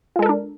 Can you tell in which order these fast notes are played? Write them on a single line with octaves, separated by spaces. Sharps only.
F4 G#3 A4 A#4 D4